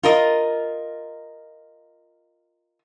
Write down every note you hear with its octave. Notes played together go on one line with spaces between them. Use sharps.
F4 A#4 D#5